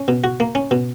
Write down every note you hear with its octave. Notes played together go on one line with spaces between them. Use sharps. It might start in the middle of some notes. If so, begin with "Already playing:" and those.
Already playing: C#4
B2
F#4
A#3
C#4
B2